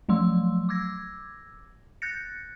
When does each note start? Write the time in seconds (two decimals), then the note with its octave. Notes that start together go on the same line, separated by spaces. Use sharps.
0.09 F3 F#3 A3 C6 E6
0.69 D6 E6 G#6 A#6
2.02 F#6 G6 A6 A#6 C#7